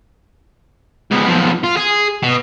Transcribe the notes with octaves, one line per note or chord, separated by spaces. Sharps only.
G#2 B3
B1 F3
F4
G#4
B2